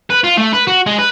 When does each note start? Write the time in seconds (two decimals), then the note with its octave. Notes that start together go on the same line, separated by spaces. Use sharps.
0.10 B4
0.24 F4
0.38 A3
0.53 B4
0.67 F#4
0.86 G#3
0.98 B4